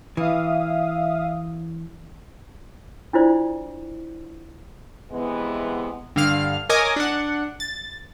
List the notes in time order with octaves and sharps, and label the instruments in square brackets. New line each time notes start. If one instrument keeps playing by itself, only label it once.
[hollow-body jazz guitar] E3 [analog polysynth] E5 F5 D#6
[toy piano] D4 E4 F4 C5 D5
[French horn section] C3 E3 G#3 B3
[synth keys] G2 D3 F5 F6
A#4 C#5 D#5 G#5 D6 D#6
D4 F#5
A6